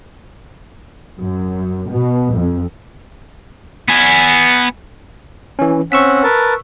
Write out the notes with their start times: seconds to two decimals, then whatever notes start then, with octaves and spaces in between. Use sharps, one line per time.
1.20 F#2
1.90 B2
2.35 F2
3.88 B3 G#5
5.59 E3 C#4
5.92 C4 C#4 F#5 C#6 E6 B6
6.24 A#4 B4 A5